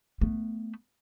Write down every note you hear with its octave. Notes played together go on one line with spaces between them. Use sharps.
A3 B3